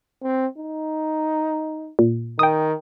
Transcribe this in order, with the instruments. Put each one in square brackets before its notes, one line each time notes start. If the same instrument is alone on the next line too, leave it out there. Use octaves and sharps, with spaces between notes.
[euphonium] C4
D#4
[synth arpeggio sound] A#2
[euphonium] D#3 [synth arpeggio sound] G5 D#6